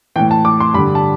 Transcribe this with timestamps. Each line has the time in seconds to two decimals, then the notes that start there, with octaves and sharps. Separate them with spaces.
0.16 A2 E3 G5
0.31 A5
0.45 D6
0.60 C6
0.74 G2 B5
0.79 D3
0.95 A5